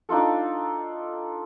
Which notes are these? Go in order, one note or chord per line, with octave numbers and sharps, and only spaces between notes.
D4 D#4 F4 A4